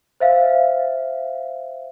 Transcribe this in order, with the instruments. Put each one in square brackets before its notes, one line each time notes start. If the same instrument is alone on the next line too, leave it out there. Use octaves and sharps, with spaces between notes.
[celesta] C5 E5 F5